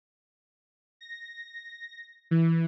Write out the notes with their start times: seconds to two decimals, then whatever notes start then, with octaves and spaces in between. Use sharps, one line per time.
1.01 A#6
2.31 E3